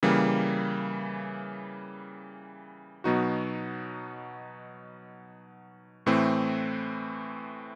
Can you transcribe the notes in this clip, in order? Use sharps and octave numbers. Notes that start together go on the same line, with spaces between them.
C#3 E3 G3 A#3
B2 F#3 B3 D#4 F#4
A2 E3 A3 C4